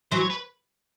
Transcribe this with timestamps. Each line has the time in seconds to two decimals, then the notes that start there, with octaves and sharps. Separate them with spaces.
0.11 E3 F#3 C5
0.21 C#5
0.30 B4